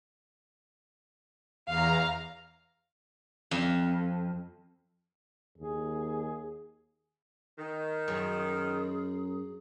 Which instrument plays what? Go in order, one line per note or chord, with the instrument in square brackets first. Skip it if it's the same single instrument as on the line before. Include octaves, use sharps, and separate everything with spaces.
[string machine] E2 A#5 [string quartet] F5
[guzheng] F2
[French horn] D#2 [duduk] G#4
[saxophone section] D#3
[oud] F#2 [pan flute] G#4